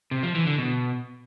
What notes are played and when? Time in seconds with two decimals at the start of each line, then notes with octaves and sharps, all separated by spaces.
0.11 C3
0.23 F3
0.35 E3
0.47 D3
0.58 B2